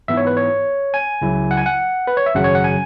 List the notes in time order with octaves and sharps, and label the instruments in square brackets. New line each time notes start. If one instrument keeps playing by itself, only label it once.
[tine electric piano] G#2 E3 B3 E4 E5
C#5
B4
C#5
G#5
C#2 C#3 F#3 E4
F#5
G#5
F#5
B4
C#5
E5
G#1 F#2 C#3 F#3 C#4 F#5
C#5
F#5
G#5